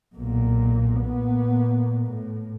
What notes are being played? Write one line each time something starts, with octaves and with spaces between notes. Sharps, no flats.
B1 A#2
A#2 B3
A2